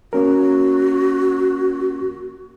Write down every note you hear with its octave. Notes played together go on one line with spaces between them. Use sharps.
A#3 C#4 F#4 A#4